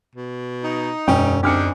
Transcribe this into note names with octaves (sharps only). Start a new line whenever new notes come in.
B2
D#4
E1 F#2 C#4 G5
D2 C4 D4 D#4 G4 F6 C#7